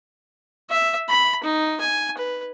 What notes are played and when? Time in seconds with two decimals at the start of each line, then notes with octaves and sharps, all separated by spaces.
0.70 E5
1.08 B5
1.43 D#4
1.80 G#5
2.17 B4